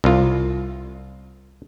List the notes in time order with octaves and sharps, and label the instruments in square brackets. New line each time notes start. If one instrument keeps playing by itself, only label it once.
[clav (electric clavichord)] C2 F4